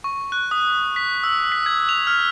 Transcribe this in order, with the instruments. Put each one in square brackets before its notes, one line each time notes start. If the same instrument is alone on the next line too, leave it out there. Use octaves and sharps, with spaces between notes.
[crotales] C#6
F#6
D#6
B6
E6
B6
G#6
F7
F6